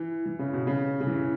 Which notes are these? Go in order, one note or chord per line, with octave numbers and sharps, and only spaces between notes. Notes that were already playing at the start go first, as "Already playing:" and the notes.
Already playing: E3
E3
C#3
B2
C#3
C#3
E3